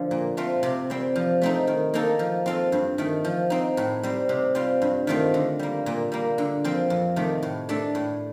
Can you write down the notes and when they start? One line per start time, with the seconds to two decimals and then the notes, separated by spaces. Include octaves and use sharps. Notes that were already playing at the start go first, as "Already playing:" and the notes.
Already playing: D3 F3
0.11 A#2
0.37 A3 C4 F4
0.63 C3
0.90 G3 C4
1.16 F3
1.42 A3 C4 D#4
1.67 D#3
1.94 A#3 D#4 A4
2.19 F3
2.46 C4 F4 A4
2.72 G2
2.98 D#3 A3
3.25 F3
3.50 C4 D#4
3.77 A2
4.03 G3 C4
4.29 C3
4.55 G3 C4 F4
4.82 G2
5.07 D#3 A3 C4 F4
5.34 D3
5.59 G3 A#3
5.86 A#2
6.12 G3 A#3
6.38 D3
6.64 F3 C4
6.90 F2
7.16 C3 D#3 A3
7.43 A2
7.69 A3 D4 A4
7.95 A2